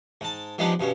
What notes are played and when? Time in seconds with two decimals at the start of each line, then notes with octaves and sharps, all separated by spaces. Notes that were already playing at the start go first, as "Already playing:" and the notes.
0.21 G#2 A5
0.58 F3 G#3 B3 D4 D#4 G4
0.80 G2 B2 C#4